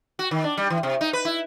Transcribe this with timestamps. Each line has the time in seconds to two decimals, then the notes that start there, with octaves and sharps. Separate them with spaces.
0.19 F#4
0.31 D#3
0.44 D4
0.57 G3
0.70 E3
0.83 C3
1.01 D#4
1.13 B4
1.25 E4